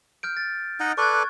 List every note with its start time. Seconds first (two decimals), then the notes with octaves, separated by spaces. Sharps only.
0.23 F6 G6 D7
0.37 A6
0.80 D#4 D#5 F#5
0.98 A4 B4 D5 C#6 F#6 G#6